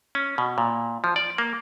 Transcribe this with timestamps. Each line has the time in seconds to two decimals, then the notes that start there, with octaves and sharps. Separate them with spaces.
0.15 C#4
0.38 B2
0.58 A#2
1.04 F3
1.16 D5
1.38 A#3